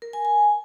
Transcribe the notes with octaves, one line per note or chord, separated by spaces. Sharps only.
A#4
G#5
G#5